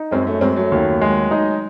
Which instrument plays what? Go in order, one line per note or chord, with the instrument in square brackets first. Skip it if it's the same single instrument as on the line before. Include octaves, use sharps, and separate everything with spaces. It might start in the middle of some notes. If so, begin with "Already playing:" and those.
Already playing: [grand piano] D#4
[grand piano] F#2 [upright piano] G#3 C4
[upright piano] A3 C#4
[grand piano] F#2 [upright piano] G#3 C4
[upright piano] F#3 A3
[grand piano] D#2
G#3
D#4